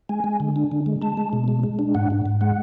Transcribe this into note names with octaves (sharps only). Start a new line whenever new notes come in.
G#3 G#5
G#3
D3
D4
D3
G#3
G#3 A5
G#3
B2
G#3
G#3
D4
G#2 F#5
G#2
G#2
G#3 F#5